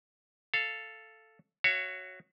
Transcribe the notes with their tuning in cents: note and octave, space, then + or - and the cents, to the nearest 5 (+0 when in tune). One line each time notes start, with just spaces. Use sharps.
A4 +0 F5 -10
F#4 +0 C#5 +0 E5 +40